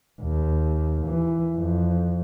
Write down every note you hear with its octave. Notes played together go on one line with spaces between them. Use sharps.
D#2
E3
F2